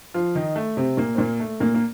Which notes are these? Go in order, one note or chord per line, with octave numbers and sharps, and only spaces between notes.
F3 F4
D#3 D#4
A3
C3 C4
A#2 A#3
C4
A#2 A#3
A3
A#2 A#3
A#3